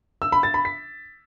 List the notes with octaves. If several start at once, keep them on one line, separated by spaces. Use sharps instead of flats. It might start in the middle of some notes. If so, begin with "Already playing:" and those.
E6
B5
A6
B5
B6